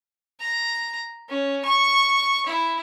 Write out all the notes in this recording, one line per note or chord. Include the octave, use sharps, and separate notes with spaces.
A#5
C#4
C#6
E4